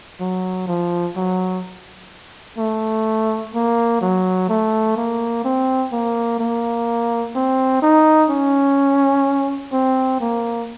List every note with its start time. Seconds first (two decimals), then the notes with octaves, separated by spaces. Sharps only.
0.20 F#3
0.68 F3
1.16 F#3
2.58 A3
3.55 A#3
4.01 F#3
4.49 A3
4.97 A#3
5.44 C4
5.92 A#3
6.39 A#3
7.35 C4
7.82 D#4
8.30 C#4
9.73 C4
10.21 A#3